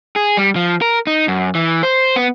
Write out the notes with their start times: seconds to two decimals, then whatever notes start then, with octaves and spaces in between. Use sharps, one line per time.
0.16 G#4
0.37 G3
0.56 F3
0.81 A#4
1.07 D#4
1.28 F#2
1.55 E3
1.83 C5
2.16 B3